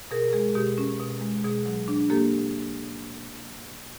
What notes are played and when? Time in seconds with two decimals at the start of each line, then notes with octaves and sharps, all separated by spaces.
0.11 B2 G#4 A#4
0.33 G#3 G#4
0.55 B2 G4
0.78 C#4
1.00 B2
1.21 G#3
1.44 B2 G#4
1.66 F#3
1.88 D4
2.10 A#3 G4 A4